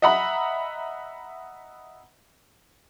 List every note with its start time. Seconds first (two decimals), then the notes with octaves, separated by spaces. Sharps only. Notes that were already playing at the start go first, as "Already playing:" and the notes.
0.02 D#5 E5 F#5 A#5 B5